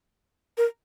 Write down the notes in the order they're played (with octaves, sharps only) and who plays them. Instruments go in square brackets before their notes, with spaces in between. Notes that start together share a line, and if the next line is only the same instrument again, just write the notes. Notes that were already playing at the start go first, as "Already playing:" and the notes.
[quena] A#4